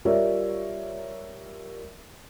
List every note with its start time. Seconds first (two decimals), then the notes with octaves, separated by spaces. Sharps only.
0.05 G3 F4 A#4 C#5 D5 E5